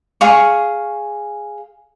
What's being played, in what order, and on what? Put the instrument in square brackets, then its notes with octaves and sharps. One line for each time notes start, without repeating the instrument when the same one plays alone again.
[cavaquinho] G#4 F5 C#6